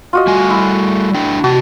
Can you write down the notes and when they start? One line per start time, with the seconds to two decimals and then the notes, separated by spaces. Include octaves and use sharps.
0.13 F4 F#4 D#5
0.27 G3 A3 G#5
0.50 E4
1.14 A3 D4 G5
1.44 C3 F#4 A5